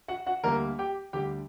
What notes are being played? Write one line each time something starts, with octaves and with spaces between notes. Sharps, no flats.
F#4 F#5
F#4 F#5
D2 D3 G3 A#3 A#4 A#5
G4 G5
D2 D3 G3 G4 G5